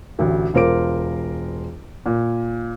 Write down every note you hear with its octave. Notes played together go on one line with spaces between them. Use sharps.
A1 D2
E1 F4 A#4 C5 D6 D7
A#2